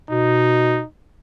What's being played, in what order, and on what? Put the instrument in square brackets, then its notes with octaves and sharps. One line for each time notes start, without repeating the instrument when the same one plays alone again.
[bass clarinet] B2 [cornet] D#4